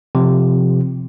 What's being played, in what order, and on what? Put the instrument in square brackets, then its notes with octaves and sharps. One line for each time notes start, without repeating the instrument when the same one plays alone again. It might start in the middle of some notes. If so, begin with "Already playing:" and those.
[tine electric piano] C3 F3